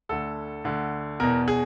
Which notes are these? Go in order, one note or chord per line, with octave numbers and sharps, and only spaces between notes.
D2 D3 A4
D2 D3
E2 B2 A#4
G#4